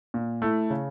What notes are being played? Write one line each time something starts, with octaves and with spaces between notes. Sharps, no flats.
A#2
A3 E4
C#3